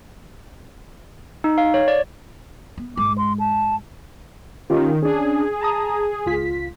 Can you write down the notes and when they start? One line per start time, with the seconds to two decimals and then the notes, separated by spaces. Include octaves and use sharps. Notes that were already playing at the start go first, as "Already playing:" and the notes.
1.44 D#4
1.58 F5
1.74 C#5
1.88 D5
2.78 B3
2.97 G#2 G#3 D6
3.18 C6
3.40 A5
4.70 D#3 C#4 F4 G4
5.02 C#4 D4 G#4
5.61 A5 A#5 D#6
6.26 C#2 F4 B6